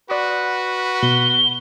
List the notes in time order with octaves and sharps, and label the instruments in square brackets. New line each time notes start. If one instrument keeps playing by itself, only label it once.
[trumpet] F#4 [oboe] B4 [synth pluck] D5 C6 D#6
[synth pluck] B2 [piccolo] G7